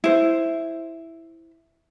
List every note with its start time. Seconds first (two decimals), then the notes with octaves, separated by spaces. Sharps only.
0.04 E4 C5